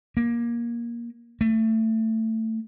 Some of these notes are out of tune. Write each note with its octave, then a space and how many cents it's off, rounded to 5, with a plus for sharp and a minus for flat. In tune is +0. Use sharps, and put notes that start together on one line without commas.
A#3 +15
A3 +20